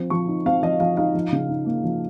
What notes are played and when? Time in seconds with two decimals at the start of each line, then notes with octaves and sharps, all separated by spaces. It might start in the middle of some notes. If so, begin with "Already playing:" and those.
Already playing: F3 C4
0.10 F3 C#6
0.28 D#4
0.45 C4 F5
0.62 F3 D#5
0.80 F3 F5
0.97 D#4 F5
1.15 F3
1.32 C#3
1.49 D#4
1.66 A#3
1.84 F3